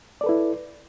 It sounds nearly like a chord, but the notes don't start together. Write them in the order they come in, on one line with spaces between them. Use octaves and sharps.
D5 A4 B4 E4